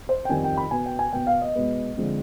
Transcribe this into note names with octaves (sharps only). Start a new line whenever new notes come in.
C5
G5
F2 D#3 G3 G#5
G5
B5
B2 B3 G#5
G5
G#5
B2 B3 G5
F5
D#5
B2 G#3 B3
D3 F3 G#3 C4